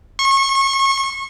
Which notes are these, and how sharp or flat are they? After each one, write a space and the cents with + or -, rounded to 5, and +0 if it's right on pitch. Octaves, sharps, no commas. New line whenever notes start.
C#6 -30